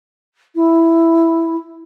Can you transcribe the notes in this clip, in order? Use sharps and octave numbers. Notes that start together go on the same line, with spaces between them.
E4